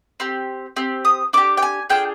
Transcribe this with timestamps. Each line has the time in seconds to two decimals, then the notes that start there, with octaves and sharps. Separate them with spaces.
0.20 C4 G4
0.76 C4 G4
1.05 D#6
1.33 D4 G4 D6
1.57 G5
1.62 G#5
1.90 D4 F4 G#4 G5